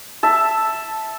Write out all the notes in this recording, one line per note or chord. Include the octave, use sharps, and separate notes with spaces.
E5 A5